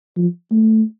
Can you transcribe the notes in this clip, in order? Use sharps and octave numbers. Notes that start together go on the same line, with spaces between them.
F3
A3